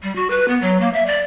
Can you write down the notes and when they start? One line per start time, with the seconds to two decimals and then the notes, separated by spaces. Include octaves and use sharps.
0.03 G3
0.16 F#4
0.30 B4
0.48 B3
0.62 F#3
0.80 A#3
0.94 E5
1.06 D5